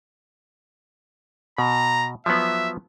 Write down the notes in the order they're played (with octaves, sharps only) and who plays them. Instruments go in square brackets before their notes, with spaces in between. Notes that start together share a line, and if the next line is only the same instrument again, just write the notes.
[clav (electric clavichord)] B2 [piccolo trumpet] A#5
[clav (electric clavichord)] F3 F#3 B3 [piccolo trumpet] E5